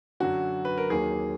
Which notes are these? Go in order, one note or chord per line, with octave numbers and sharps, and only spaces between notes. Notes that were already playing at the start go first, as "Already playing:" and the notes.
F#2 D3 F#3 F#4
B4
A#4
D#2 D#3 F#3 A#3 G#4